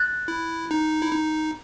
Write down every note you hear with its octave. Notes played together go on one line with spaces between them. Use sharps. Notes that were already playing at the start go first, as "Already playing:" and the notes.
Already playing: F#6 A6
E4
D#4
E4
D#4